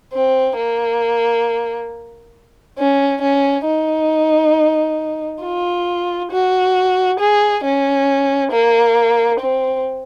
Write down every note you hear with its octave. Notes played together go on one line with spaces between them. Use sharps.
C4
A#3
C#4
C#4
D#4
F4
F#4
G#4
C#4
A#3
C4